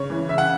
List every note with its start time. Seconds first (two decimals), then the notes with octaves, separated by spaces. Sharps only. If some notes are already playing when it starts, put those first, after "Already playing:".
Already playing: C#3 C#5
0.10 E3
0.29 C#3 E5
0.38 F#5